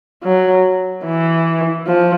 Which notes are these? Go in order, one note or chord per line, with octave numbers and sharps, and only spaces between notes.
F#3
E3
F3